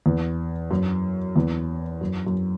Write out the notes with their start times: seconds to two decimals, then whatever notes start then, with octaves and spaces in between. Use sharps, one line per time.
0.06 E2
0.71 F#2
1.36 E2
2.01 F#2
2.27 F#2